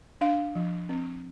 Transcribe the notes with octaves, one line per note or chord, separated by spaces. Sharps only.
D4 F5
F3
C4